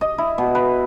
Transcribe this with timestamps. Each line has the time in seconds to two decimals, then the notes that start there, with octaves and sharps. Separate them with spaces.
0.01 D#5
0.18 E4
0.38 B2
0.55 B4